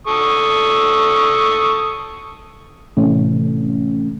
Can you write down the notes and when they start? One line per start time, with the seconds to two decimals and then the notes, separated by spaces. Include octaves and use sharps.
0.07 A4 C#6 D#6
2.97 A2 C3 E3 A3 C#4